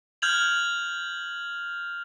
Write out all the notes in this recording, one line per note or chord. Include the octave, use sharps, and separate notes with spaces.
F6 G6 G#6 F7 F#7